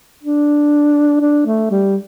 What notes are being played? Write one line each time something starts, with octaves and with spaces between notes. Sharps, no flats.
D4
D4
A3
G3